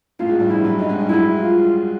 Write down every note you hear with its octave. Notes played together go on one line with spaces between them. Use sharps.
A2 A3 F4
G#2 G#3
G2 G3
F3 E4
F3
F#3
G2 G3 D#4
G#2 G#3
G2 G3
F#3 E4
F4